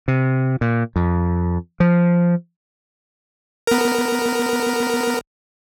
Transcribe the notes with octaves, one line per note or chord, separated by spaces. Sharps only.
C3
A#2
F2
F3
B3 A#4